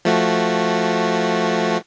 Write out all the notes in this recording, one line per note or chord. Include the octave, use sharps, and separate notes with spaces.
F3 A3 F#4